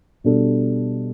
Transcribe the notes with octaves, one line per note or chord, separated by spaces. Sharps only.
B2 G3 D4 A4